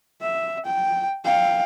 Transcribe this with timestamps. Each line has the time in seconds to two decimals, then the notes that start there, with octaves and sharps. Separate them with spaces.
0.22 E5
0.66 G5
1.25 F5 G5